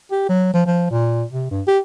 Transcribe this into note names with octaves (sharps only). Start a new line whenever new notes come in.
G4
F#3
F3
F3
A#2
C3
G2
G4